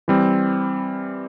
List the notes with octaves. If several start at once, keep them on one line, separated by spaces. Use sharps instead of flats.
E3 G3 C4